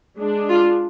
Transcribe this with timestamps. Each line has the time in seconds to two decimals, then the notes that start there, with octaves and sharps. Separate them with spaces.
0.20 G#3 D4
0.49 F4